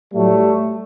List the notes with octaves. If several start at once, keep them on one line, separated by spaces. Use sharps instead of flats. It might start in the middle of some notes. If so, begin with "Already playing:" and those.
A2 F#3 G3 A3